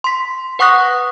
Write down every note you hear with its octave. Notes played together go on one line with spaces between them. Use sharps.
C6 B6
B4 F#5 C#6 D#6 F#6 A#6